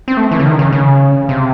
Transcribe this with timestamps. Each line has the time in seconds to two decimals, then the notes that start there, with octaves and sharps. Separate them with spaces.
0.08 C4
0.17 A3
0.31 E3
0.39 C#3
0.46 D#3
0.59 C#3
0.73 C#3
1.29 C3